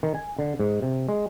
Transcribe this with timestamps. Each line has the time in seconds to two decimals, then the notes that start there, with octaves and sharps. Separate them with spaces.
0.03 D#3
0.15 G#5
0.39 D3
0.60 G#2
0.82 C3
1.09 G#3